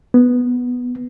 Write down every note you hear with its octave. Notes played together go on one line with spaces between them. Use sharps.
B3